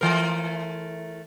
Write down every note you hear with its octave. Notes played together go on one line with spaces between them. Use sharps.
E3 A3 A#4